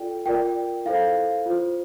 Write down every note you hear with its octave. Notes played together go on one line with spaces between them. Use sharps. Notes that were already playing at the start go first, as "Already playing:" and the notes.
Already playing: F4 A4 D5 G5
F4 A#4 D5 G5
E4 A4 C5 F5
F4 C5